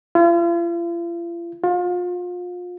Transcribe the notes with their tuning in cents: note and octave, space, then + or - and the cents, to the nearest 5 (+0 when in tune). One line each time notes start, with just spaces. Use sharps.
F4 -45
F4 +30